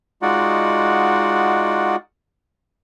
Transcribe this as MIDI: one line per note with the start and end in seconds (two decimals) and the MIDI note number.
0.22 1.96 56
0.22 1.96 63
0.22 1.96 65
0.22 1.96 66
0.22 1.96 74
0.22 1.96 78